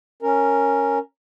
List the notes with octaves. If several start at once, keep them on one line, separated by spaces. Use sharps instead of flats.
C#4 A#4